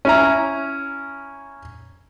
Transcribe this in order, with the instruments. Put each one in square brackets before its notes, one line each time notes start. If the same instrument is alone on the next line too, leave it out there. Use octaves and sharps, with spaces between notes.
[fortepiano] C#4 E4 A#5